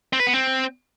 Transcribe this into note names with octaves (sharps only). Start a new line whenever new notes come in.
C4
B4
B3
C4